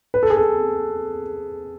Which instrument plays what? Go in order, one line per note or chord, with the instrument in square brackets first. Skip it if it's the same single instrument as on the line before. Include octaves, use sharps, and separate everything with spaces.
[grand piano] B4
A4
G#4
A4